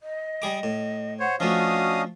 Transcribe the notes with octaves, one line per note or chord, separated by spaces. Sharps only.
D#5
G3 G#4 D6
A2
C5 C#5 F#5
F3 A3 C#4 D4 F#4 D#5 F5 D#6